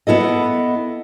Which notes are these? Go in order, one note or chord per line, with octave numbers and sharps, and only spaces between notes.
B3 E4 A4 D#5